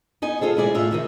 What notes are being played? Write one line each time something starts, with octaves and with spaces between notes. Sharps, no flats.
B3 D#4 G#5
F4 G#4 A4 C5
B2 G#3 E4 D5 G#5
A2 F4 E5
C3 D#3 E3